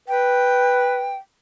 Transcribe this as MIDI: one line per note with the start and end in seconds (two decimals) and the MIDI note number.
0.08 1.14 71
0.08 1.16 79